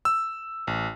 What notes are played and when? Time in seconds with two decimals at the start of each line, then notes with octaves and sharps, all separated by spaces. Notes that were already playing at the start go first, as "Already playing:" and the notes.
0.05 E6
0.67 A1